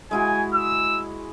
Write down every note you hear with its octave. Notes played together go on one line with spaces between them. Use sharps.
G#3 E4 F#4 G#5
E6